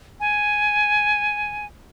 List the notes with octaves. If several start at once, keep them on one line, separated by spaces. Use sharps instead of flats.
G#5